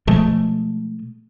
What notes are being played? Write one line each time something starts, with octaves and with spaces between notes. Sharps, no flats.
B2 F3 G#3 A3